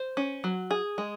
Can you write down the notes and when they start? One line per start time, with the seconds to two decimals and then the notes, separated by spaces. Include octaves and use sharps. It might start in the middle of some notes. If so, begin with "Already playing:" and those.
Already playing: C5
0.17 C#4
0.44 F#3
0.71 G#4
0.98 G#3